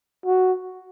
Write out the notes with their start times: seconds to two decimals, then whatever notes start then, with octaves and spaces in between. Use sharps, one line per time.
0.26 F#4